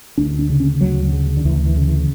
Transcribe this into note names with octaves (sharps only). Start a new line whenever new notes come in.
D2 D4
D4
C#3
C#4
D2 F#3
C#3
D3
D2 E3
E3
C#3
E3